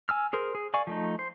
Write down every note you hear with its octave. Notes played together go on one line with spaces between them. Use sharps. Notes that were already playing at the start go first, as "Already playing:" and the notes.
G#5 E6 F6
G#4 A#4 C5
G#4
D5 F5 G#5 C#6
F3 A3 D#4
C5